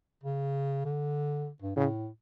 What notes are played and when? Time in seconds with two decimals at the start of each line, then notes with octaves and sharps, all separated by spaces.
0.23 C#3
0.85 D3
1.62 G2
1.76 A2 C#3